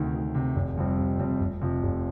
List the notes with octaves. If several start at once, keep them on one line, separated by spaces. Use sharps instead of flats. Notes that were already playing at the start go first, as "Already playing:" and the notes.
Already playing: D2 C3 D#3
D2
C3 D#3
F1
F2 C3 G3 C4
F1
F2 C3 G3 C4
F1
F2 C3 F3
F1